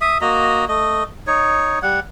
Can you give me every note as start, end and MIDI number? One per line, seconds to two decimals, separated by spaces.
0.01 0.18 76
0.01 0.18 87
0.21 0.65 58
0.21 0.65 66
0.21 0.65 75
0.21 0.65 82
0.68 1.04 57
0.68 1.04 75
1.27 1.79 63
1.27 1.79 73
1.82 2.00 55
1.82 2.00 78